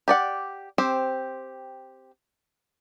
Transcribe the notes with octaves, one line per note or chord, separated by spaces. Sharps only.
G4 D5 F#5
C4 G4 C5